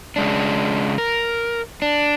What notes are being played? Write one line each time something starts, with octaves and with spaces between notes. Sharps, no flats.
C#3 G#3 D4
A#4
D4